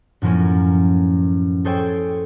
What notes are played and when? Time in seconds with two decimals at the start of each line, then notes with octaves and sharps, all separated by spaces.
0.22 F#2 A2 F3 A#3 C#4
1.65 G#4 A4 C5 C#5 G5